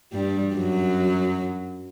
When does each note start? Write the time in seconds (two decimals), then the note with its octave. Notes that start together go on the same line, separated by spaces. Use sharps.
0.13 G2 G3
0.55 F#2 F#3